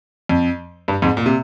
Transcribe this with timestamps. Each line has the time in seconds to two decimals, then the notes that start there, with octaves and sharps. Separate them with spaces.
0.29 F2
0.88 G2
1.02 F2 G#2
1.17 A#2
1.26 C3